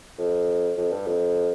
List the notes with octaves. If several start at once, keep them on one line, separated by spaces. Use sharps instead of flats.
F2
F2
G2
F2